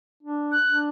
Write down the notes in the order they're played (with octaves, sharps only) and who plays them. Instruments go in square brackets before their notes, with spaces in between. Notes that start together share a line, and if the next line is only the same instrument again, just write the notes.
[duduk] D4
[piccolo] F#6
[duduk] D4